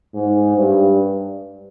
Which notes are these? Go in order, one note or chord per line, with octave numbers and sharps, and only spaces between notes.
G#2
G2